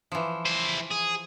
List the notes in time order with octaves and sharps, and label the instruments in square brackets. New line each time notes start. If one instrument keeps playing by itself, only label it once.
[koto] E3 F3
[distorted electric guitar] E4 C5
G#4